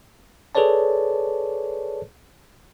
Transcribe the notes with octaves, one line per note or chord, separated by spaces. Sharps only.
G#4 A4 B4 C#5 D5 A5